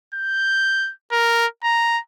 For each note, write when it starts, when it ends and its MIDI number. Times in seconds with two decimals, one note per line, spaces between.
0.15 0.92 91
1.12 1.46 70
1.64 1.99 82